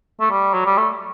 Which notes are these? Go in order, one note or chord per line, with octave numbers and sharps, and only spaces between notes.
A3
G3
F#3
G3
A3